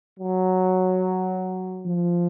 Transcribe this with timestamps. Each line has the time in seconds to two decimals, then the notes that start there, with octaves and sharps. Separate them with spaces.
0.17 F#3
1.86 F3